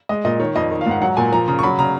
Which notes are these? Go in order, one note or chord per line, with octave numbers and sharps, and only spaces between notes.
G#3 D#5
A#2 D#5
D#3 C#5
F2 D#5
D#3
F5
G#2 F#5
F#3 F#5
A#2 G#5
F3 A#5
C#3 A#5
C#6
F#3 B5
C#3 A#5